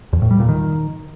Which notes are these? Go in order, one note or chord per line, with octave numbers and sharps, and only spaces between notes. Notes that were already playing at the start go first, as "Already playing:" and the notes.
E2
A2
G3
A#2
D#3